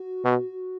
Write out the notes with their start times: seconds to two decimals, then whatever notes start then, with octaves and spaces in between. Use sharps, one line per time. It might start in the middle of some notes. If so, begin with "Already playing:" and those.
Already playing: F#4
0.25 B2